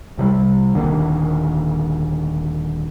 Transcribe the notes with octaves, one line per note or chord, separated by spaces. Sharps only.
C2 C3 F#3 G3
D#1 D3 D#3 A#3